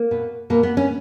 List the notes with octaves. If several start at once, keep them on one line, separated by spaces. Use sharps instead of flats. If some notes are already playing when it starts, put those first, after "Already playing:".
Already playing: A#3
B2
B2 A#3
B3
C#4